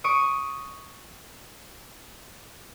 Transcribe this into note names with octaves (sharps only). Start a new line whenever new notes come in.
C#6 D#6 D7